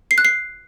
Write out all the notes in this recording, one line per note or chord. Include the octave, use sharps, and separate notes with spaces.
C7
F#6
C7